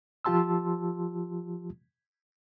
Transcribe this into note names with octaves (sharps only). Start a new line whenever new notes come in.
F3 F4 G4 A5 C6 E6